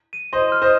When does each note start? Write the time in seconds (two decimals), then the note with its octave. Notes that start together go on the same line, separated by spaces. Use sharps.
0.13 D#7
0.33 C5 D#5 C6
0.52 F6
0.62 C5 D#5